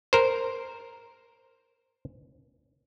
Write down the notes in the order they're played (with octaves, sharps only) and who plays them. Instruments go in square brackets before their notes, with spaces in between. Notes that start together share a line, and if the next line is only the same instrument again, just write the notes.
[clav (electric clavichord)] A#4 C5